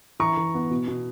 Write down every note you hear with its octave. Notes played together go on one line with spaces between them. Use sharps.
E3 A#5 C#6
E3
B3
B2
B2